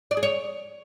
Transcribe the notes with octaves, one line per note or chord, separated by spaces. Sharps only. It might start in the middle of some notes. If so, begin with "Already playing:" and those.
D5
G#4
C#5